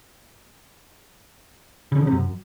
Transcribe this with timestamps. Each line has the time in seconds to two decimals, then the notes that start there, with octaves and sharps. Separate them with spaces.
1.92 C#3
1.97 D3
2.02 C#3
2.07 C3
2.12 F#2